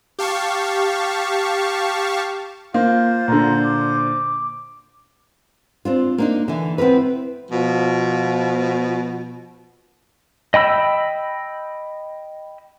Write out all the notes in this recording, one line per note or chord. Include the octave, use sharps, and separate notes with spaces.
G4 F5 A5 C#6
A#3 F4 C5
A#2 D3 A#5
D6
C4 D4 F4
A#3 D4 D#4
D3 E3
B3 C4 E4 A#4 B4
B2 F3
D#5 G5 B5 E6